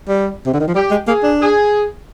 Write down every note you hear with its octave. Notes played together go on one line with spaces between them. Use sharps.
G3
C3
D3
D#3
F3
G3 G4
G#3
A#3 G#4
D4
G#4